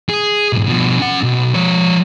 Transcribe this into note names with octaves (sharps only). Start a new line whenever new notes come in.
G#4
B1 G#2
B2 F3
C#4 F#5
B1
F3 C#5